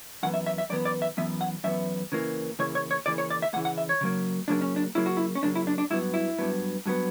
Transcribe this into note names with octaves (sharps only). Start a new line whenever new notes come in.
F#2 E3 B3 F#5
E5
E5
E5
F#2 E3 B3 D5
D5
E5
F#2 E3 B3 E5
F#5
F#2 E3 B3 E5
C#3 E3 A#3
C#3 E3 A#3 C#5
C#5
C#5
C#3 E3 A#3 D5
C#5
D5
E5
C#3 E3 A#3 F#5
F#5
E5
C#5
C#3 F#3 A#3
C#3 F#3 A#3 D4
C#4
D4
C#3 F#3 A#3 E4
F#4
E4
C#4
C#3 F#3 A#3 D4
E4
D4
D4
G2 F#3 B3 E4
E4
G2 F#3 B3
G2 F#3 B3